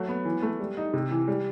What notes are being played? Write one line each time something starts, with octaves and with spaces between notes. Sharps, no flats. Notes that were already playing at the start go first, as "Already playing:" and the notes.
Already playing: F#3 A3
B3
E3
A3
G3
D#4
C3
E3
G3